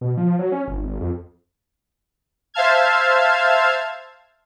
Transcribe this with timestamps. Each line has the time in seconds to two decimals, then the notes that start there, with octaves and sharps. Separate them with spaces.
0.01 B2
0.17 F3
0.39 F#3
0.52 C#4
0.68 G1
0.83 G#1
1.01 F2
2.54 C5 E5 F5 A5 F6 G#6